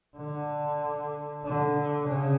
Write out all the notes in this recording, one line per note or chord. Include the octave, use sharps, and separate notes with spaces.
D3
D3
C#3